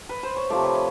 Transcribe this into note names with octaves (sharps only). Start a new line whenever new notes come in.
B4
C5
C#5
C3 F3 A3 C5 D5
B4 C#5
C#5